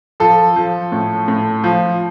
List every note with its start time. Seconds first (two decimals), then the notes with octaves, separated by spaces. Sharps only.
0.20 F3 A4
0.56 F3
0.92 A2
1.28 A2
1.64 F3